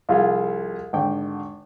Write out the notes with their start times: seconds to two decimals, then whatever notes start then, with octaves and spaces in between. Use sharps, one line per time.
0.09 C2 F3 F4 G#4
0.93 G#1 D3 G5